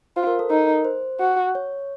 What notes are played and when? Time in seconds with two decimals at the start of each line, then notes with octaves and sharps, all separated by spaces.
0.16 F4 C5
0.27 A#4
0.39 A4
0.50 D#4 A#4
0.85 C5
1.20 F#4
1.55 C#5